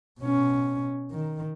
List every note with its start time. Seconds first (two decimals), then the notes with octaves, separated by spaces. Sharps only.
0.20 B2 C#4
1.11 D#3